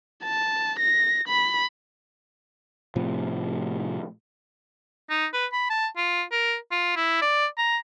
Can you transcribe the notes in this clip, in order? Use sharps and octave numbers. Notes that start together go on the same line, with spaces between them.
A5
A#6
B5
A2 C3 F3
D#4
B4
B5
A5
F4
A#4
F4
E4
D5
A#5